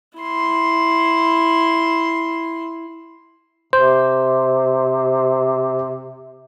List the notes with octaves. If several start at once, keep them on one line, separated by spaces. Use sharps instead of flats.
E4 C6
C3 C5